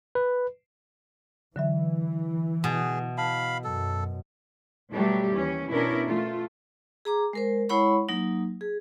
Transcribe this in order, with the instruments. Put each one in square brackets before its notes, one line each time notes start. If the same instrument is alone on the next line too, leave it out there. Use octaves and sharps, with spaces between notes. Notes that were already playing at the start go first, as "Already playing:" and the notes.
[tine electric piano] B4
[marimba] D3 F#3 E5 [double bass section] E3
[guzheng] B2 [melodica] G#4
[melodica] F5 B5 [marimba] A5
[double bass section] F#2 [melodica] A4
[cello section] B2 F#3 G3 A3 G4
D#2 E3 C#4
B2 C#4 D4 E4 A#4
A3 F4
[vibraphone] G#4 A#5 D6
G#3 A#4 C5
G#3 E4 C#5 F#5 B5 C#6
F#3 A#3 D#4
G#4